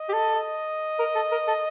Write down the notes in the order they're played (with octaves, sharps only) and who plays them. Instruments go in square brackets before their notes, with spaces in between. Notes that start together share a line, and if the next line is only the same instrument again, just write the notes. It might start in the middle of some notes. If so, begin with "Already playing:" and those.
Already playing: [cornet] D#5
[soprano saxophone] G4
A4
[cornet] D#5
[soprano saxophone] A#4
A4
A#4
A4